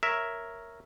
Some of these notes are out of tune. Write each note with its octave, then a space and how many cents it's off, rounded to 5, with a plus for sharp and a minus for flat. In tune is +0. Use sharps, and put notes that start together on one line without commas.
A#4 +0 C#5 +0 E5 +0